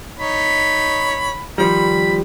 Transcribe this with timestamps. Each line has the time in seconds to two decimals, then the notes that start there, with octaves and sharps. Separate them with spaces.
0.18 D#4 C#5 B5
1.58 D#3 F3 G3 B5